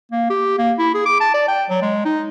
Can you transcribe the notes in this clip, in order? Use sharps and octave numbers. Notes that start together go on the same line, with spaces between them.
A#3
G4
A#3
E4
G#4
D6
A5
D5
G5
F#3
G#3
D#4